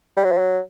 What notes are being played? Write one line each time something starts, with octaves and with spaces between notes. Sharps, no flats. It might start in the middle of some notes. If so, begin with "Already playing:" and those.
G3
F#3
F3
F#3